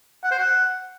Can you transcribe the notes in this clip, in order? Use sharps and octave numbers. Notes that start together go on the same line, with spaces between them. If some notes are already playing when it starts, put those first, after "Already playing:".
F#5
C5
F#5